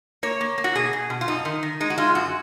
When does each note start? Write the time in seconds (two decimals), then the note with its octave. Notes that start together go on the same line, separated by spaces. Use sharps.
0.23 A#3 C#5
0.41 A#3
0.58 A#3
0.64 F#4
0.75 B2 G#4
0.93 B2
1.10 B2
1.21 F4
1.28 F#2 D#4
1.45 D#3
1.63 D#3
1.80 G#3 D#4
1.90 F#4
1.98 G#3 F4
2.15 F#2 F#4